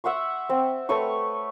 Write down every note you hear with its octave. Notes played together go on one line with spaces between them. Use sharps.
E5 F#5 C6 C#6
C4
A3 B4 C#5 C#6